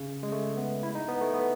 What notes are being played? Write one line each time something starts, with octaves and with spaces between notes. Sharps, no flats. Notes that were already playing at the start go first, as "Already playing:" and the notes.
Already playing: C#3
G#3
A3
B3
E4
D#4
B3
A3
B3